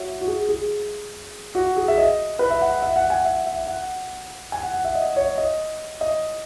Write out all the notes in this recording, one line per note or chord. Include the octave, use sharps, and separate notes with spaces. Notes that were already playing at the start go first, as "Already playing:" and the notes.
Already playing: F#4 C#5 E5
F#4
G#4
G#4
F#4
G#4
E5
D#5
B4
E5
F#5
E5
F#5
G#5
E5
E5
F#5
G#5
F#5
F#5
E5
D#5
C#5
D#5
D#5